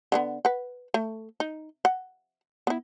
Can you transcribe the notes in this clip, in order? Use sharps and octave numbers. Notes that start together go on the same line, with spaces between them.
D3 A3 B3
B4 F#5
A3
D#4
F#5
B3 E4